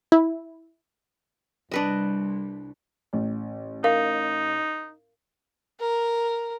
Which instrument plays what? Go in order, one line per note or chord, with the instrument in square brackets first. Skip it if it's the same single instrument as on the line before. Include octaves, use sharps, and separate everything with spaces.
[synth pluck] E4
[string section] C2 [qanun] D4 B4 D#5
[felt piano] A1
[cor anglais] D#4 [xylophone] A#4 F5
[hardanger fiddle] A#4